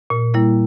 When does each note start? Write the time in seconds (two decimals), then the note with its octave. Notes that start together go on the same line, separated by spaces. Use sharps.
0.10 A#2
0.34 G3 A#3 E4